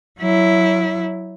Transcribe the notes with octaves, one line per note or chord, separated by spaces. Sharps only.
F#3 E4